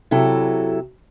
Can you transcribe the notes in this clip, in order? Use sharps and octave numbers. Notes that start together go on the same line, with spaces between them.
C3 F#3 E4 A4